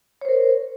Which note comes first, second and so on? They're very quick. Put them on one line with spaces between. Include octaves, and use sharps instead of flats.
C#5 C5 A#4